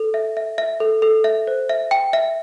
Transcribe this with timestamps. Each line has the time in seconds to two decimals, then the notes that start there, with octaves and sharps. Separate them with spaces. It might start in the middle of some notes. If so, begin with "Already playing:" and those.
Already playing: A4
0.14 E5
0.37 E5
0.58 E5
0.80 A4
1.02 A4
1.24 E5
1.47 C5
1.69 E5
1.91 G5
2.13 E5